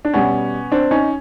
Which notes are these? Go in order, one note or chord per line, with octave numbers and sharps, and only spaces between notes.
D4
B2 G3 B3 C#4
C4 D4
C#4 D#4